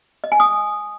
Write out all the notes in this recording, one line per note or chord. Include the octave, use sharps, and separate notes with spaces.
D#5
G#5
D#6